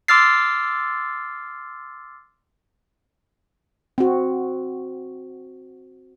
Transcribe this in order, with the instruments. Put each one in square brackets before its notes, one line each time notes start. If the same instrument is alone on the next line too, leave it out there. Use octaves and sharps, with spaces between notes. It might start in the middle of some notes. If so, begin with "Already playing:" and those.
[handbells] C6 D6 E6 F6 A6 C7
[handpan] C4 F#4